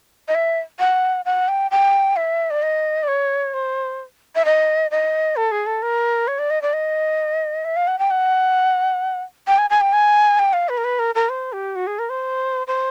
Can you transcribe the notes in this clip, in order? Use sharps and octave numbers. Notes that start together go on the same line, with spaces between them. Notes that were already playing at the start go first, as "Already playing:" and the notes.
D#5
E5
F#5
F#5
G5
G5
E5
D5
D#5
D5
C#5
C5
E5
D#5
D#5
A4
G#4
A4
A#4
C#5
D5
D#5
D5
D#5
E5
F5
F#5
G5
F#5
G5
G#5
G#5
G5
G#5
G5
F5
B4
A#4
B4
A#4
A#4
C5
G4
F#4
G#4
A#4
C5
C5